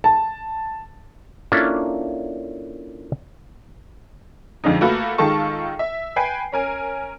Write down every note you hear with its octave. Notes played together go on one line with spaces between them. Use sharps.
A5
A#3 C#4 D4 E4 F4 A4
F2 D3 F3 G#3 D#4
A3 A#3 F4 F#4 A4 B4
D#3 G#3 F4 A4 A5 C#6
E5
B4 G5 G#5 C7
C#4 A#4 G#5